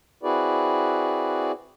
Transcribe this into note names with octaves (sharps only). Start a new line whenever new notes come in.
C4 E4 F#4 G#4 B4 D5